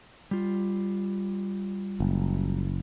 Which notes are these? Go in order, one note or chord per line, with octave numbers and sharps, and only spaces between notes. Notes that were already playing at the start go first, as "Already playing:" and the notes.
G3 F4
F#1